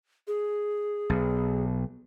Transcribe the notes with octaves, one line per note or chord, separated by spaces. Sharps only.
G#4
B1